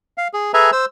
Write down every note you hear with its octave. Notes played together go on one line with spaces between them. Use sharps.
F5
G#4
G#4 A4 B4 E5 G#5 A#5
C5 E6